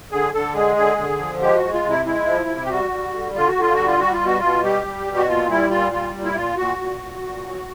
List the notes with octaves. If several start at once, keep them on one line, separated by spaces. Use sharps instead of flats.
D3 G#4
D3 A4
G#3 G#4
D3 G#4
D3
F3
G#3 G4
F#4
G#3
F4
C3
E4
G#3 E4
F3
C3
G4
G3 F#4
G3
D3
D3 F4
F#4
D3
F4
G3 F#4
F4
G3 F#4
F4
B2 F#4
B2 F4
G3 G4
G3
B2
F#4
A#2 F4
G3 E4
A#2 F4
G3 F4
A#2
E4
A#2 F4
A#2 F#4
A#2
A#2
A#2
F#3